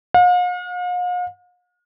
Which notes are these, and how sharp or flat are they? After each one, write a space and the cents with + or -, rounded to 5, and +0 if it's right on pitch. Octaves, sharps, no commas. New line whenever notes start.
F5 +45